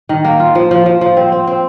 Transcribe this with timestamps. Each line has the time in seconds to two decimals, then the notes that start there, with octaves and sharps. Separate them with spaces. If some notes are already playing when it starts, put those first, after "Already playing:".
0.09 D#3
0.25 A#3
0.40 F4
0.55 F3
0.71 F3
0.86 F3
1.01 F3
1.17 C4
1.32 C4
1.47 C4